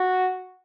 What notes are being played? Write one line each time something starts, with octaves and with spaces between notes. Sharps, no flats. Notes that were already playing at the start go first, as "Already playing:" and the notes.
Already playing: F#4